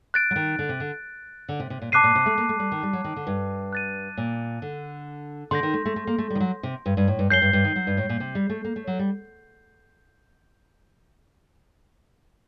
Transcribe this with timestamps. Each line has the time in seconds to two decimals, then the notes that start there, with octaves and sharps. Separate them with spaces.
0.14 F#6 A6 D7
0.31 F#3
0.36 D#3
0.59 D3
0.69 C3
0.80 D3
1.49 D3
1.60 C3
1.70 C3
1.82 A#2
1.92 C3 A5 D6 F#6 C7 D#7
2.04 A#2
2.15 C3
2.26 A3
2.38 A#3
2.49 A3
2.59 G3
2.72 D#3
2.83 G3
2.93 F#3
3.04 D#3
3.16 D3
3.27 G2
3.73 F#6 A6 D#7
4.17 A#2
4.62 D3
5.51 D3 C6 G6 A#6
5.63 D#3
5.74 A3
5.85 A3
5.96 A3
6.07 A#3
6.18 A3
6.30 D#3 G3
6.40 F#3
6.63 C3
6.86 G2
6.97 G2
7.08 A2
7.19 G2
7.30 F#2 G6 C7 G7
7.42 G2
7.53 G2
7.64 D#3
7.76 F#3
7.87 G2
7.97 A2
8.09 A#2
8.20 C3
8.35 G3
8.50 A3
8.64 A#3
8.76 A3
8.87 F#3
8.99 G3